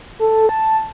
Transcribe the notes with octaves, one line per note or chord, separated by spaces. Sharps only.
A4
A5